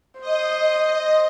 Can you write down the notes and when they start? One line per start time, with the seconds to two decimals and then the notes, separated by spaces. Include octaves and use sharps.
0.20 C5 D#5
0.81 D#5